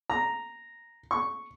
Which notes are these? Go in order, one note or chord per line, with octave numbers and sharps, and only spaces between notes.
A#5
C#6